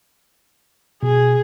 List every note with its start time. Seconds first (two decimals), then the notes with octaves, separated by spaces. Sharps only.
1.03 B2 G#4